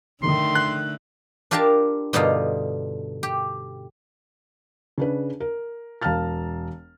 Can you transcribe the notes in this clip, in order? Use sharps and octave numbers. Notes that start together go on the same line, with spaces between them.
D3 D#3 A3 C6
F#6
D4 F4 G4 A#4 F5 A5
G2 B2 D3 D#4 F4
G4
C#3 D4 B4
A#4
E1 F5 A5 A#5 F6 A6